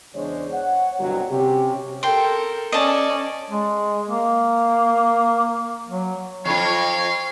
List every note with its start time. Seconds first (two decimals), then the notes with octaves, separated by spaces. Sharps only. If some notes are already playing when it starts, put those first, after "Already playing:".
0.14 E2 C#3 G#3 D4 C5 C#5
0.51 C#5 F#5
0.99 G1 C2 G2 B2 F#3
1.30 C3 C#4 G4
2.03 A4 A#4 G5 C6
2.72 C#4 D5 D#5 A5
3.50 G#3
4.09 A#3
5.89 F#3
6.45 F2 F4 C#5 F5 C#6